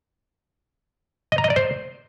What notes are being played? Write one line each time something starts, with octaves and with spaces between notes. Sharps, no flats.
D#5
A#5
D#5
D5
C5